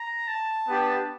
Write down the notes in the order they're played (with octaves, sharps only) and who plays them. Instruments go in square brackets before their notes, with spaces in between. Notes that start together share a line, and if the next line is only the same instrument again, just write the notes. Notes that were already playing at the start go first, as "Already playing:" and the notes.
Already playing: [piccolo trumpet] A#5
A5
[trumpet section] B3 D4 G4